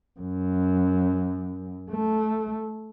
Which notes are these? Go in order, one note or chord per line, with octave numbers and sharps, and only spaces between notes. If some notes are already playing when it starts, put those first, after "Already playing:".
F#2
A3